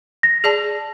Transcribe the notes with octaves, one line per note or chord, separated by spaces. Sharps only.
A#6
G#4 D5 A5